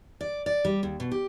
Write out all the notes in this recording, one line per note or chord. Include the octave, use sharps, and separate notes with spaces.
D5
D5
G3
D#2
B2
G4